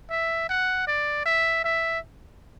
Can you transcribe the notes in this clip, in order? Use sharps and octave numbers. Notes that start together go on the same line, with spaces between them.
E5
F#5
D5
E5
E5